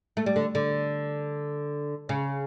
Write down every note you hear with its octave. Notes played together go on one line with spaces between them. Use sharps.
A3
G3
D3
D3
C#3